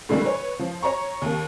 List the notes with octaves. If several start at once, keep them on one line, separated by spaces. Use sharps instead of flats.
A2 D3 E3 G3 A3 A#3
B4 C#5
F3
C#5 A#5 C#6
D#2 A#3